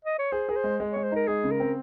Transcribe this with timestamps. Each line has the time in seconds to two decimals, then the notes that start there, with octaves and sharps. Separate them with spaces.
0.05 D#5
0.19 C#5
0.32 G#4 C5
0.49 G#4 A#4
0.56 C5
0.64 G#3
0.80 G#3
0.92 G#3 C#5
1.04 C5
1.12 D#4 A#4
1.28 G#3 G#4
1.44 C#3
1.51 A#4
1.60 C4